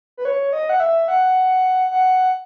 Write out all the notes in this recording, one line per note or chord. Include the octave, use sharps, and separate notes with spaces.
B4
C#5
D#5
F#5
E5
F#5
F#5